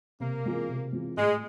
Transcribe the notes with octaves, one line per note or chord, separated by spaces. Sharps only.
C3 A#3
E3 G#3 C4 F4
C3
E3 G#3 C4 F4
A2 G#3